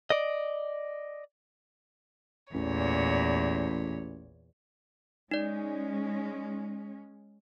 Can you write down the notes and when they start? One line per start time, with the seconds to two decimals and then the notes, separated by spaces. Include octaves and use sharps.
0.10 D5 D#5
2.54 A1 E2 A#2 C#5
5.31 G#3 C#4 D#4 D5